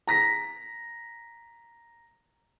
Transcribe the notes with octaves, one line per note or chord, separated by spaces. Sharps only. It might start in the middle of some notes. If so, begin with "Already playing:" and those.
A#5 A#6 B6